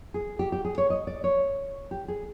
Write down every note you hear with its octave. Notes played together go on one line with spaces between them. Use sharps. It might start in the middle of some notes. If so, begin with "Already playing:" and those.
G#4
G4
G4
G#4
C#5
D#5
D5
C#5
G4
G#4